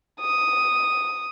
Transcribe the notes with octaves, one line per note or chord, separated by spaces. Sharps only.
D#6